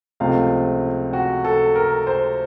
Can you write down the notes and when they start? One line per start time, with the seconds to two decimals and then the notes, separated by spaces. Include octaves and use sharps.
0.20 C#2 C3 F3 A3 C4 F5
1.13 F#4
1.44 A4
1.75 A#4
2.07 C5